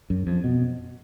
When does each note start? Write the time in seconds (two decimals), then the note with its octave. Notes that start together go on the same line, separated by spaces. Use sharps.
0.10 F#2
0.27 F2
0.44 B2